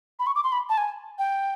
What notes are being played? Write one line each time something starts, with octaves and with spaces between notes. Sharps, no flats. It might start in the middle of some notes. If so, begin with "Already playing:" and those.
B5
C#6
D6
C6
B5
A5
G#5
G5